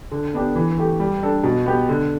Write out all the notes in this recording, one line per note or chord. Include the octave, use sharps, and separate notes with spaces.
D3
B3 D4 G4
E3
A3 G4
G3
D4 A4
B2
B3 G4
D3